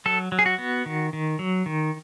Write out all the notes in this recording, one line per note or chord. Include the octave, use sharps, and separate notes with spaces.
F#3 A4
F#3
G#4
F#4
B3
D#3
D#3
F#3
D#3